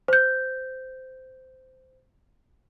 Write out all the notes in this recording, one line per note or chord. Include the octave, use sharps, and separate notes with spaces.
C5 G6